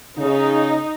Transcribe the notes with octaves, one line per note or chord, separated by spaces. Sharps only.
C#3 D#4